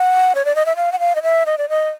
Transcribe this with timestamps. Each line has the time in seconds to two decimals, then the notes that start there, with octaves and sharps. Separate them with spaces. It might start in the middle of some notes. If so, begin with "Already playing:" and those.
Already playing: F#5
0.35 C#5
0.45 D5
0.55 D#5
0.66 E5
0.76 F5
0.92 F#5
0.99 F5
1.15 D#5
1.23 E5
1.46 D#5
1.58 D5
1.69 D#5